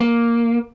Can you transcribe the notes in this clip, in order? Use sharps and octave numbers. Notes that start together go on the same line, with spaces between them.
A#3